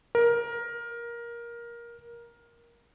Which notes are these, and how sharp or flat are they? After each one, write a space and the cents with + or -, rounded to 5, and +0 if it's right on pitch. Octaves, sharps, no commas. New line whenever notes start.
A#4 +15